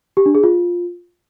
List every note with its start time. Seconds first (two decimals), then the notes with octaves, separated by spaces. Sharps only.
0.17 G4
0.26 D4
0.35 G#4
0.43 F4